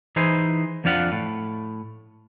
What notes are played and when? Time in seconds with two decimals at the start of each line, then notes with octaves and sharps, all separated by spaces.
0.16 E3 D#4 E4 G#4 C5
0.84 F2 F3 D4 D5 F5 F#5
1.12 A2